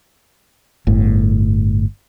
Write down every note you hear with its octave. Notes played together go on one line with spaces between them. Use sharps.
G1 A2